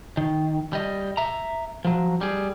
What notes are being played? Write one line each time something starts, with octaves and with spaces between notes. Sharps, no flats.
D#3
G3 D#5
E5 A#5
F3 F#3
G3 G#4